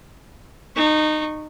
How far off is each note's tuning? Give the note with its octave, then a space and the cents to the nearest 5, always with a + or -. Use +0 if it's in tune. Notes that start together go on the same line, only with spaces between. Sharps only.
D#4 -20 C#6 -10